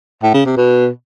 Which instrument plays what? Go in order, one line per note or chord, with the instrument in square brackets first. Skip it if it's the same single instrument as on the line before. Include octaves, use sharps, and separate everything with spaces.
[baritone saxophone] A2
C#3
C3
B2